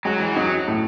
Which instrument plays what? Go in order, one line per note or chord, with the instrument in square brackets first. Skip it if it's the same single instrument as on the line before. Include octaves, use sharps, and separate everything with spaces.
[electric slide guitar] F#3 [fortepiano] G#3
[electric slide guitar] E3
[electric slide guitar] F#3 [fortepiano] D#4
[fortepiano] A2